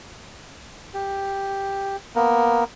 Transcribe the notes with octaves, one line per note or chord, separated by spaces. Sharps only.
G4
A#3 B3 A#4